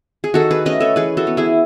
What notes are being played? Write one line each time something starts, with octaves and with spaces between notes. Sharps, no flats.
G#4
D#3 F#4 A4
G#4 B4
A3 C#4 B4 D#5
A4 C#5
E3 G#4 B4
F#4 A4
B3
E4 G#4